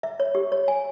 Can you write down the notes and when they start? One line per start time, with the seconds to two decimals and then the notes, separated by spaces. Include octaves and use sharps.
0.03 E5
0.20 C#5
0.35 G4
0.52 C#5
0.68 G#5